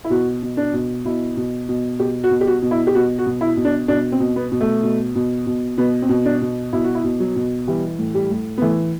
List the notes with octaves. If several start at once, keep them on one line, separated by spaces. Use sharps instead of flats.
E4
B2 F#4
B2
D4
B2
B2 E4
B2
B2
B2 G4
F#4
B2
G4
F#4
B2
E4
G4
B2 F#4
F#4
B2
E4
B2
D4
B2 D4
C4
B2
B3
B2
A3
B2
B2
B2
B2 B3
C4
B2
D4
B2
B2 E4
F#4
E4
B2
F#3
B2
E3 G3
A2
G3
A2
B3
E3 A3